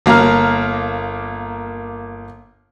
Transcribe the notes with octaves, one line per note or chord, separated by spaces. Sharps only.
G1 A#3 F5 A#5 F6